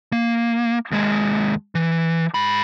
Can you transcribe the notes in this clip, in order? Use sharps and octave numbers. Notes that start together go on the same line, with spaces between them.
A#3
D#2 G#3
E3
G#2 B5